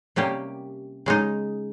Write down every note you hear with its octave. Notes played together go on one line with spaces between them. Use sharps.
C3 G3 A#3 C#4 G4
C#3 G#3 D#4